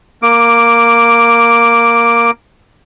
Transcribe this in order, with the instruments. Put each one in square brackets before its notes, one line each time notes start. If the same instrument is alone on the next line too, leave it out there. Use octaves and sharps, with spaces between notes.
[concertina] A#3 D6